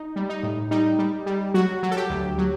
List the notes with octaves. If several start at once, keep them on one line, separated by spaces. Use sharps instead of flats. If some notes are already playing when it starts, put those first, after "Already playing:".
Already playing: D#4
G3
D#4
A2
G3 D#4
G3
G3
F#3 F#4
F#3
A4
G4
D2
F#3